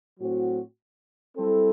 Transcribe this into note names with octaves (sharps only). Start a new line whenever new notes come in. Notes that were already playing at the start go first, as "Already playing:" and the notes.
A2 F#3 C4 F#4
G3 C4 E4 A4